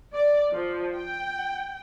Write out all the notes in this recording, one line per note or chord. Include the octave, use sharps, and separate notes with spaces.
D5
F3
G5